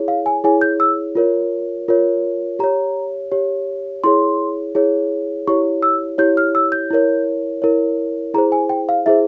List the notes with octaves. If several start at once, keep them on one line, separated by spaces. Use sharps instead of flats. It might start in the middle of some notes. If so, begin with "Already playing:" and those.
Already playing: E4 G#4 C#5
F5
G#5
E4 G#4 C#5 G#5
G6
E6
F4 A#4 C#5
F4 A#4 C#5
G4 C#5 A#5
G4 C#5
E4 G#4 C#5 C6
E4 G#4 C#5
E4 G4 C#5 C#6
E6
E4 G4 C#5 G6
F6
E6
G6
E4 A#4 C#5
E4 A#4 C#5
E4 G#4 C5 A#5
G#5
G5
F5
E4 G#4 C5 E5